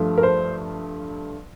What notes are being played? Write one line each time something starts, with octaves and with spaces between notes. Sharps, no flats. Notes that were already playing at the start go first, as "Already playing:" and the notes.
Already playing: G2 F3 A3
A#4
C5